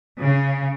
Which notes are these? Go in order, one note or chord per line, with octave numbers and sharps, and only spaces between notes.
C#3